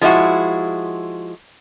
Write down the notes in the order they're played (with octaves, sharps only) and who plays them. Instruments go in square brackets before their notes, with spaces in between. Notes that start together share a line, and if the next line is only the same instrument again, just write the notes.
[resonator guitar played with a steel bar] F3 G#3 E4 F#4